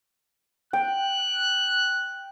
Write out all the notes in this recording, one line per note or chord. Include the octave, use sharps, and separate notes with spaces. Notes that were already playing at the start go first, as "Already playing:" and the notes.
G5 F#6